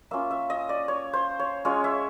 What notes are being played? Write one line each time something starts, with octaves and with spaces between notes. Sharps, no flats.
A#3 C#4 F4 E5
E5
D#5
D5
C#5
C5
C#5
G#3 C#4 F4 C#5
E5